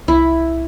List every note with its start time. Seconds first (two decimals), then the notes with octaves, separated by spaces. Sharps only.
0.08 C2 E4